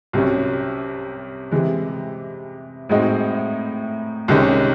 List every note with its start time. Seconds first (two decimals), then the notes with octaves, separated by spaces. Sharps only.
0.13 C2 C3 F#3 C#4
1.52 C3 E3 G#3
2.89 A2 G#3 C4 D#4 F#4
4.28 C2 C3 D#3 G#3 C#4